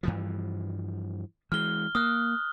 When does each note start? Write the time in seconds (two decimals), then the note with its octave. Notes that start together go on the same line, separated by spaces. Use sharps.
0.03 G2 E3 F3
1.52 E3 G#3 F6 G7
1.95 A#3 D#6 F6 F#6